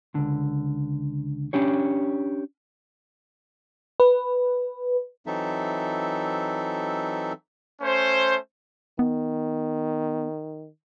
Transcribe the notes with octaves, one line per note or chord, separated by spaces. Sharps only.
C#2 D3
C#4 D4 G4 C#5
B4
E3 F#3 C4 D#4 A4 E5
A3 C#4 C5
D#3 B3